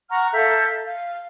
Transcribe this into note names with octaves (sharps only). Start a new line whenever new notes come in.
F#5 A#5 C#6 F6
A4 E5 F5 G6
F5